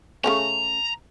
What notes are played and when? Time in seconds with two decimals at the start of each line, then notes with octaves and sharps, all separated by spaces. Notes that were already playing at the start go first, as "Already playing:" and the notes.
0.24 C#3 A3 C#4 A#5